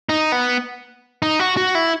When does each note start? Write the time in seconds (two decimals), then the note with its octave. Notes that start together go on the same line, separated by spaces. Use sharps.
0.09 D#4
0.32 B3
1.22 D#4
1.40 F#4
1.57 F#4
1.75 E4